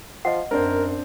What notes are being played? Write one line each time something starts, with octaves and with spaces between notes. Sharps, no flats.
F3 D#5 F#5
F#2 C4 D4 A#4 C5